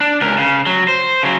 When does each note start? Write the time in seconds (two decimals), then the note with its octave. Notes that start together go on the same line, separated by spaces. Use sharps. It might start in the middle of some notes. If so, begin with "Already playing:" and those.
0.01 D4
0.21 C#2 A#4
0.38 C#3
0.66 F#3
0.88 C5
1.23 C#3 F#3